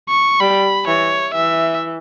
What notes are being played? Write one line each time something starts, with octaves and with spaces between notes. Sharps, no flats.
C#6
G3 B5
E3 C#5
E3 E5